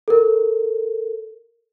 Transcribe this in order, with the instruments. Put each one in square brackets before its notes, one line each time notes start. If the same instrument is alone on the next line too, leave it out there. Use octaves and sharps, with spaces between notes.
[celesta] A4 A#4